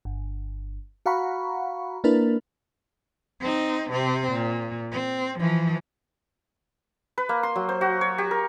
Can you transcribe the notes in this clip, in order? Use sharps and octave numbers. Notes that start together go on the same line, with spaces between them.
G1
F#4 F5 F#5 A#5 B5 C#6
A#3 D4 E4 A#4 B4
C4 D#4
C3 C4
A#2
C4
E3 F3
B4
A#3
C6
F#3
C5
F#4
C#5
G4
A#4